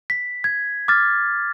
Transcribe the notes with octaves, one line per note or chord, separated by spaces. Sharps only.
B6
G#6
D6 F6 A6